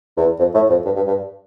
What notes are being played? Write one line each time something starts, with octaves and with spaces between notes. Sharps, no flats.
E2
F2
A2
F2
G2
G2
G2